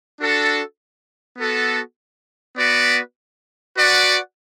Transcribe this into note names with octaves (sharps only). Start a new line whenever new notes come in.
D4 F#4 A4
B3 F#4 A4
B3 F#4 B4 D5
F#4 B4 D5 F#5